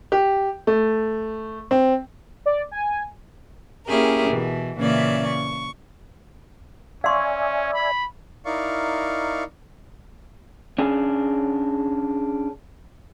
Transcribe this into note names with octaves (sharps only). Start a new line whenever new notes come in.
G4
A3
C4
D5
G#5
A#3 C#4 E4 G4 G#4 A#4
B2 E3
A#2 C#3 E3 C#4 D5 E5
C#6
C#4 D5 E5 F5 G#5 C6 C#6
B5
D#4 E4 A#4 D5 F5 C#6
C#4 D4 G#4